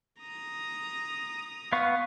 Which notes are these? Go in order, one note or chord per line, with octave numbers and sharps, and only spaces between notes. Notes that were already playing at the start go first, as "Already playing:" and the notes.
A#5 D#6
B3 F5 C#6